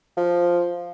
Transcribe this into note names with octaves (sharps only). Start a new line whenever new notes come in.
F3